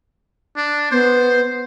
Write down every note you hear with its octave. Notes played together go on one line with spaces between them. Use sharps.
D4
B3 C5